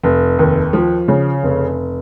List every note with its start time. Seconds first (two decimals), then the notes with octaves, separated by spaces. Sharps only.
0.04 F1
0.39 D#2
0.73 F3
1.08 C#3
1.43 F1